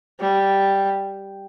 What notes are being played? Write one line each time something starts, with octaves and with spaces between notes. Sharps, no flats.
G3